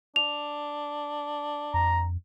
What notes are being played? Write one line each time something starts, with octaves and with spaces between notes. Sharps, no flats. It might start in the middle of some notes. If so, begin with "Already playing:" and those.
D4 F7
F2 A#5